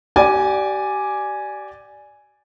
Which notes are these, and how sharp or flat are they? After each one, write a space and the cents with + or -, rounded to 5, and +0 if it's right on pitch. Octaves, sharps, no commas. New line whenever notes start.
G4 -35 D5 +0 G#5 +0